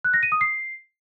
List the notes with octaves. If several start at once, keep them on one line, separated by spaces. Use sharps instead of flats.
F#6
A#6
D#7
D#6
C7